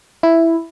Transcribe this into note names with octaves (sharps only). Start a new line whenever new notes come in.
E4